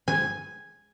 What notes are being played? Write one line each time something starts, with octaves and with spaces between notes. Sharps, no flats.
G#5